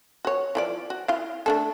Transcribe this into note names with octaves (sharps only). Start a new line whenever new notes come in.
F#4 C#5
E3 F3 D5
F#4
E4 F5
A3 D4 A4